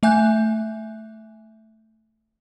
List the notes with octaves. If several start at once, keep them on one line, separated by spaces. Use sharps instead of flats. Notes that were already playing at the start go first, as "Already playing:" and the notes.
A3 E5 G#5 F#6 G6